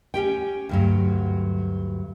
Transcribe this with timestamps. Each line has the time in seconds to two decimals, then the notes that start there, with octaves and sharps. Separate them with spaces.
0.14 C#4 G4 G5
0.69 D2 G2 F#3